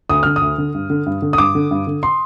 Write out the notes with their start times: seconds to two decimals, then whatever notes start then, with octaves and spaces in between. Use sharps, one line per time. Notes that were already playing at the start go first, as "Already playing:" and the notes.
0.09 D2 D#6
0.23 D3 F6
0.36 D#6
0.41 D2
0.58 D3
0.74 G2
0.90 D3
1.06 G2
1.22 D3
1.33 D#6
1.38 G2 D6
1.55 D3
1.71 G2
1.87 D3
2.03 C6